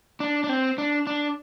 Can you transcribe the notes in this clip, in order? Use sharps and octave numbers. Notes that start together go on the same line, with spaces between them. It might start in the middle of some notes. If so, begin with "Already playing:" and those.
D4
D4
C4
D4
D4